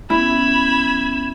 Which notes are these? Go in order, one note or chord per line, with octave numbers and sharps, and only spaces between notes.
B3 C#4 E4 B5 G#6 E7